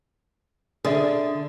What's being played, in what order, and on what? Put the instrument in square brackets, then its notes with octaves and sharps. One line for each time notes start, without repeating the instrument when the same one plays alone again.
[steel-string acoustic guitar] D3 [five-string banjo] G#4 D5 E5